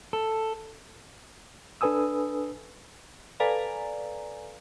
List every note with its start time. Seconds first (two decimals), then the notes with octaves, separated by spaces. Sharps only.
0.13 A4
1.81 D4 A4 B4 G#5 D#6 E6
3.40 A4 B4 D5 F5 G#5 A#5